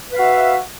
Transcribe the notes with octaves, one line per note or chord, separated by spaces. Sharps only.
F#4 B4 E5 F5